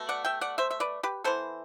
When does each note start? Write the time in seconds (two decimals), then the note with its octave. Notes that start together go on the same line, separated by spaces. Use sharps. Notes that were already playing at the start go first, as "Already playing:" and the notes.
Already playing: B2 A3
0.09 D5 F#5
0.25 E5 G5
0.41 D5 F#5
0.58 C5 E5
0.71 E5
0.80 B4 D5
1.03 G4 B4
1.24 E3 B3 A4 C5